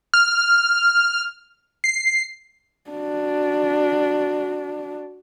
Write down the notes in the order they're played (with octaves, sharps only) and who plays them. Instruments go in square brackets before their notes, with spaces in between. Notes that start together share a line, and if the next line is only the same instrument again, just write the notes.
[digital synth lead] F6
C7
[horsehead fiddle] D4 F#4